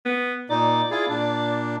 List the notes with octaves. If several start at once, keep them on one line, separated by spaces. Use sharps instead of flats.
B3
A#2 D#4 D5
E4 F4 G#4
A#2 D4